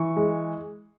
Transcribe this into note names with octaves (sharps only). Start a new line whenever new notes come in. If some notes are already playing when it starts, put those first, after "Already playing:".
Already playing: E3 C#6
G#3